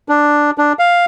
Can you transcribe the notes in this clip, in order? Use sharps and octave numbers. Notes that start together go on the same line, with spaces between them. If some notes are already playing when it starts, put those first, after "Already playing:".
D4
D4
F5